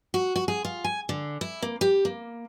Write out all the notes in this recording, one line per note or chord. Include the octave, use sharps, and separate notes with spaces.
F#4
F#4
G#4
F4
G#5
D3
E4
A#3
G4
A#3